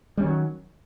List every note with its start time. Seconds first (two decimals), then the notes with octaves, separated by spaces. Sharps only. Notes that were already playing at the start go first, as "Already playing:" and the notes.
0.17 G3
0.21 C#4
0.24 D#3
0.27 F#3